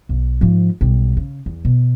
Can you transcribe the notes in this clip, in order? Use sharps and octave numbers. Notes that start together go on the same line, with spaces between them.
B1
G#2 F3
B1 G3
C#3
E2
B2